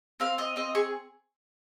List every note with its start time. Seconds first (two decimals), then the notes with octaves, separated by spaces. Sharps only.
0.20 C4 F5
0.38 F4 D#5
0.56 C4 D#5
0.75 G#4 C#6